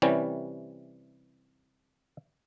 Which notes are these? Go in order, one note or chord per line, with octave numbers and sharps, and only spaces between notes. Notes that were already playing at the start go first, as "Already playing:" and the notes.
C3 E3 G3 C#4